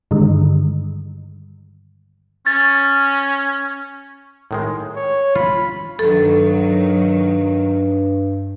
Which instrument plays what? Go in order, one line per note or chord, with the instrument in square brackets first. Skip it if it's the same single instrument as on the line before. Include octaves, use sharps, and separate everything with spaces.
[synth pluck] G2 D3 D#3 G3 G#3
[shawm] C#4 [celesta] A6
[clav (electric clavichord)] A2 D#3 G#3
[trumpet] C#5
[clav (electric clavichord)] F4 [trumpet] B5
[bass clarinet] G2 [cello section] D#3 F#3 [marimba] A4